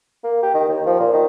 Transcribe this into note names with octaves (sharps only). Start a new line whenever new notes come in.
A#3
G4
D#3
D#2
F3
A#2
D#3